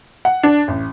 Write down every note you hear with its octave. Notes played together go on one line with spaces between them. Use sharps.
F#5
D4
A1